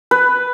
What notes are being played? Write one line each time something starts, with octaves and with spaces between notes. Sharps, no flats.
B4